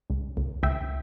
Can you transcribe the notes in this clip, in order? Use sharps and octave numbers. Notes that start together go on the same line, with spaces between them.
C#2
C#2
C#2 E5 G5